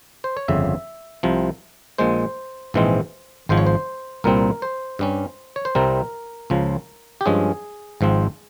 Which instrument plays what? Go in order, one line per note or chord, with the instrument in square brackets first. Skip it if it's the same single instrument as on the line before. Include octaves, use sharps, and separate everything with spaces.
[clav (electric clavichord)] C5
C#5
G1 F2 C#3 E5
C2 C3 F3
A#1 A#2 G#3 C5
A#1 G#2 E3 G#3 C4
G#1 G#2 F3 C5
C#5
C5
C2 A#2 G3 C4 A#4
C5
G2 G3 C#4
C#5
C5
C2 C3 G3 C4 A#4
C#2 C#3 F3
G4
G2 F3 G#3 C#4 G#4
G#1 G#2 F3 C4